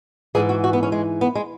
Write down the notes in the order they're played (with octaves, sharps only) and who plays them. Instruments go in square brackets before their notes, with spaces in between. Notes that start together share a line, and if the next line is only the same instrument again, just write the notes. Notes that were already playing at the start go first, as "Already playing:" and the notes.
[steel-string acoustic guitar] G#2 E3 G#4
F#4
F#4
B3
C#4
G#3
B3
G#3